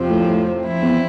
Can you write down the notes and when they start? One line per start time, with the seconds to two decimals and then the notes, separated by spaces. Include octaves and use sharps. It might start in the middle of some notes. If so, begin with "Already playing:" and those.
Already playing: F2 C3 F3 C4
0.10 A2
0.27 A2
0.64 F3 C4 E4
0.82 E2